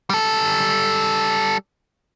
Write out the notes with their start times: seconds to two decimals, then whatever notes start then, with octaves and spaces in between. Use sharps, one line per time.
0.10 G3 A4